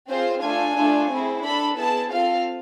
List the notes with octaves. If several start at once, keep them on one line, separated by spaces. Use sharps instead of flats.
C4 F4 G#4 C5
A3 D4 F4 A4 G#5
A3 D4 F4 A4
C4 E4 G#4
D4 A4 B5
B3 E4 G#4 A5
C4 F4 A4 F5